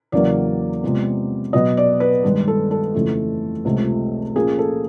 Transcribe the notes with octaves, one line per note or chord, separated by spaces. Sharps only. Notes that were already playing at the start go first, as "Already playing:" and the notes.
E2 C#3 F#3 A#3 D5
C3 F3 G#3 B3
B2 F#3 B3 D#5
D5
B4
G2 D#3 G#3
A4
A4
F2 C#3 E3 A3
C#2 C3 F3 A3
A#2 F3 A#3 C#4 G#4
A4